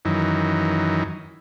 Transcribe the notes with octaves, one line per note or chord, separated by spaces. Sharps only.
F#2 D#3 E3